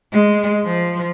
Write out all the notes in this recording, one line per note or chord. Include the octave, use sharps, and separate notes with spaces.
G#3
F3